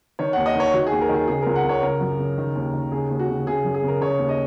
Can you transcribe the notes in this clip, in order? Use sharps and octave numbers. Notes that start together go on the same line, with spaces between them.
D#3 C#5
D#2 F#5
D#5
D#3 C#5
D#3 F#4
G#4
D#2
A#4
D#3
G#4
C#3 G#4
C#2 A#4
F#5
C#3 C#5
C#3 A#4
F#2
C#3
D#3
D#2
D#3
C#3 G#4
D#2
F#4
C#3
C#3 G#4
F#2
G#4
C#3 A#4
C#3 C#5
D#2
D#5